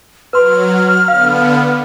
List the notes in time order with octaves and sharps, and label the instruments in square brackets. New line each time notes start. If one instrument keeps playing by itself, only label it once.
[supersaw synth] F#3 [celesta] B4 C6 [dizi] F6
[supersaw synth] D3 B3 [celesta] F5